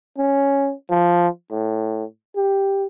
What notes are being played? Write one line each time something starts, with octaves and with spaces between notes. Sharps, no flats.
C#4
F3
A2
G4